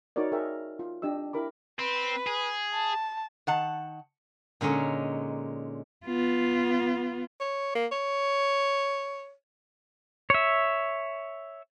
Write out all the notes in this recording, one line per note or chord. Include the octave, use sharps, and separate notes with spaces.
D#4 F#4 A#4 C#5 D5
G#4 A#4 E5 G5
F4
D4 G4 D#5 E6
E4 G4 A#4 B5 D6
C4 B4
G#4
A5
D#3 F#5 A5
A#2 D3 G#3 C#4 D#4
B3 F4
C#5
A#3
C#5
C#5 E5